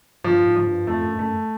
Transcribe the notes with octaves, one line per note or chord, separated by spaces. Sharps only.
G2 F3
G#2
F3
G2
F2 A3
F#2
F#2 A3